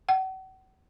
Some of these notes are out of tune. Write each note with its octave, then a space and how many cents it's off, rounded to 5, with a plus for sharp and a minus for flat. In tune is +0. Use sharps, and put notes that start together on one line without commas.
F#5 +40